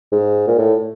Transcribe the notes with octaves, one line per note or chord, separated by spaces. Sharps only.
G#2
A#2
A2